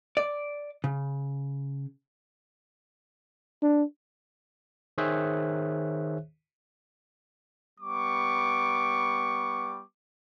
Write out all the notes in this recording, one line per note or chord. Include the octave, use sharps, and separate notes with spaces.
D5
C#3
D4
D#3 G#4 C5 C#5 E5 F#6
G3 B3 C#6 D6